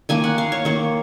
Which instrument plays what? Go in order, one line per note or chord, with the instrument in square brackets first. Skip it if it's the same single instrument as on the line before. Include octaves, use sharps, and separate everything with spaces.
[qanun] D#3 A#3 G#5
F#5
F5
C#5
D#3 A#3 C#5